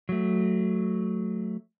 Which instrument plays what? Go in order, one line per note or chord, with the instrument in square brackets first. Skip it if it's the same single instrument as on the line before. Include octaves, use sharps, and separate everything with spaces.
[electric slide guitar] F#3 A3